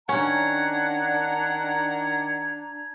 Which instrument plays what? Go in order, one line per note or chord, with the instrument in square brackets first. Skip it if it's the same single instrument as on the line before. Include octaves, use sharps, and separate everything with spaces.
[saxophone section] D#3 F#5 [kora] C#4 [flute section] D4 A#5 G#6